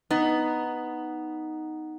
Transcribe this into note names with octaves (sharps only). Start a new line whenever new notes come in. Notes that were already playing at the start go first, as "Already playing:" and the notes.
B3 D#4